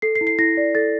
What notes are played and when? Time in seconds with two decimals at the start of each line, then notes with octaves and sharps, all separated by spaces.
0.02 A4 C7
0.15 C7
0.21 E4
0.27 C7
0.39 E4 A#6
0.57 D5
0.75 A4 A6